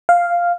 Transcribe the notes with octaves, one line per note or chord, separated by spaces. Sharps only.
F5